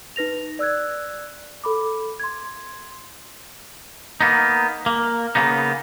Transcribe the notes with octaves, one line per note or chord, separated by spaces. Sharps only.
D#4 B4 A#6 F7
D5 E6 F#6 G#6
A4 B5 D6
C6 G#6
A#3 B3 D#4
A#3
C#3 A#3 B3 D#4